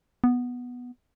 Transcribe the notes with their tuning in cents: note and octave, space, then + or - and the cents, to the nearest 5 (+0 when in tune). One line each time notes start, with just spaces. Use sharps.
B3 -5